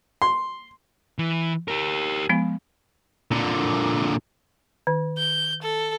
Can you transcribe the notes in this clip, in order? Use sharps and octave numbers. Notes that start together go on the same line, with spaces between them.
C6
E3
G4 A#4
F3 G#3 B3
A#2 D3
D#3
G6
A4